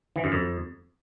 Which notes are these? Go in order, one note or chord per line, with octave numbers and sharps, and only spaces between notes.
E3
F#2
F2